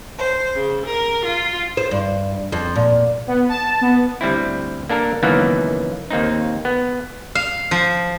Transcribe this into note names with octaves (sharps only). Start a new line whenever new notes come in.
C5
C#3
A#4
F4
C5
G2
F2
A#2
B3
A5
B3
D2 G3 C4 E4
A#3 D4 A4 A#4
C#2 F#2 D#3 E3 A#3 B3
D#2 A#3 C4 D#4
B3
F5
F3